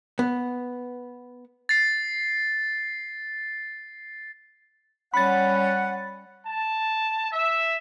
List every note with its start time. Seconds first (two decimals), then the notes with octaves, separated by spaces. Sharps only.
0.19 B3
1.69 A6 C7
5.14 G3 C#4 F#5 B5 A6
6.46 A5
7.32 E5